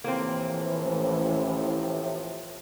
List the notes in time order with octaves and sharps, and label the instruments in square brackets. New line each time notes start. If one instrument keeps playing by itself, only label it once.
[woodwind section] A2 C3 F3 [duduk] E3 [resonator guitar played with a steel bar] A#3 C4
[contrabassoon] A1